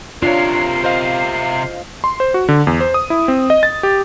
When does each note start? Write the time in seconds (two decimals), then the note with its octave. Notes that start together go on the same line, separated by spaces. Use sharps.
0.22 C3 D4 F4 A#4 C#5 C7
0.84 C5 D#5 F5
2.04 C6
2.20 C5
2.34 F#4
2.49 D3
2.67 E2
2.81 C5
2.94 D#6
3.10 E4
3.28 C4
3.50 D#5
3.63 A6
3.83 G4